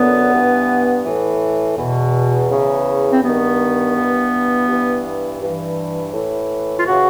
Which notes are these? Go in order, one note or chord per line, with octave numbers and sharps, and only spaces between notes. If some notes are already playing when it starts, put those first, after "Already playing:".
Already playing: F#2 D3 B3
G2 E3
A2 E3
E2 B2
E2 C#3 E3
C4
G2 D#3 B3
G2 E3
G2 E3
G2 E3
A2 E3
F4
C#3 E3 F#4